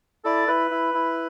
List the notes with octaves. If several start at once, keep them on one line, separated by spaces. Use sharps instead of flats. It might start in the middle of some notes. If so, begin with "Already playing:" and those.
E4 A4 D5
E4 B4
E4
E4